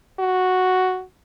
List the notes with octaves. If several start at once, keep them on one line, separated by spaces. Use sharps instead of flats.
F#4